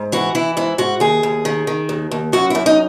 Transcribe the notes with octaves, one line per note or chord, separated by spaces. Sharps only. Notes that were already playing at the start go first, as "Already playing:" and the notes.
Already playing: G#2
E3 F#4
E3 E4
G#2 E4
G#2 F#4
D#2 G#4
D#2
D#3
D#3
D#2
D#2
F#2 F#4
F#2 E4
D#4